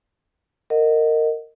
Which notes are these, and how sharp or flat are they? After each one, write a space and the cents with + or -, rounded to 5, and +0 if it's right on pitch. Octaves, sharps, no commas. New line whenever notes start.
A#4 -20 D#5 +0 F#5 -15